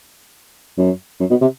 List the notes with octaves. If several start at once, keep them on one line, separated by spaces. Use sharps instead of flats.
F#2
F#2
B2
C3